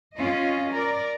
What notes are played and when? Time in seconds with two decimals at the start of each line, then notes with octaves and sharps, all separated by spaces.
0.17 C#4 F4 D#5
0.72 A#4 D5